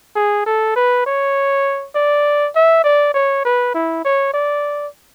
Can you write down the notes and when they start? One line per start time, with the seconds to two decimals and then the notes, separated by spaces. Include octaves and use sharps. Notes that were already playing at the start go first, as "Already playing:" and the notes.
0.16 G#4
0.46 A4
0.76 B4
1.06 C#5
1.95 D5
2.56 E5
2.84 D5
3.14 C#5
3.45 B4
3.74 E4
4.05 C#5
4.34 D5